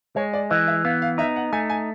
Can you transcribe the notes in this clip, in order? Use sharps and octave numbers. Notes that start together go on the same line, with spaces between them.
G#3 C#5
D5
E3 D#5
E5
B3 F5
F5
D#4 E5
F#5
A3 G#5
G#5